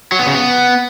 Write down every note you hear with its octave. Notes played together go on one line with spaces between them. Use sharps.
F#3
B3
C#3
B3